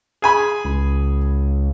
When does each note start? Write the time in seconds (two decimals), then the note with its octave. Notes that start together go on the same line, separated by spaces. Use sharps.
0.22 G#4 G#5 B5
0.65 C#2